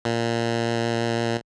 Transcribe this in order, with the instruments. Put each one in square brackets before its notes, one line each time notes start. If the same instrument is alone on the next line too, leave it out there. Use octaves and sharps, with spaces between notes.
[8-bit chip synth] A#2